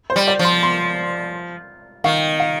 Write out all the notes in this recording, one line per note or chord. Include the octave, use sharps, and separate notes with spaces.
C5
G3
D5
F3
C6
C6
D#3 F5
F5